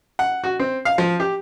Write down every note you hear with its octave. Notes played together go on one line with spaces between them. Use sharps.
F#5
F#4
C4
F5
F3
G4